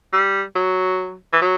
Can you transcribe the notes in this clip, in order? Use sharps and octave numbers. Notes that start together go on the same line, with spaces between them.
G3
F#3
E3
F#3